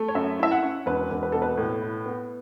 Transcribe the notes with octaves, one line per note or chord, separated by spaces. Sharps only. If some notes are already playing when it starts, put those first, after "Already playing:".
Already playing: A3
C#5
F#2 E5
E4 E5
F#5
C#4
E1 B4
E1
B4
B2 A4
B4
A2
E4
B3